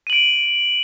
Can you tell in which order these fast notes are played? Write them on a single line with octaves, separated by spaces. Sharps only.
D#7 F#7 D7